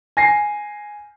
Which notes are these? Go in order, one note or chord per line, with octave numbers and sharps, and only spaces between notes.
G#5 A#6 C7